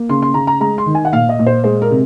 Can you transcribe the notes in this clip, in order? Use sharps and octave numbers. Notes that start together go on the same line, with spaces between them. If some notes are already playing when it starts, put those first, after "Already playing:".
Already playing: A#3
C#3 C6
C6
C#3 A#5
A#5
G#3 A#5
C6
D#3
G#5
F#5
A#2 F5
D#5
A#2
C5
G#3 C5
A#4
C3